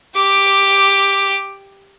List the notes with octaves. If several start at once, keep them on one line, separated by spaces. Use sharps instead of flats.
G4 D6